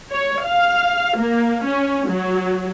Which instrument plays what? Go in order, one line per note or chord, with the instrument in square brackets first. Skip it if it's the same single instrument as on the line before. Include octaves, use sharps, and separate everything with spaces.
[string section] C#5
F5
A#3
C#4
F#3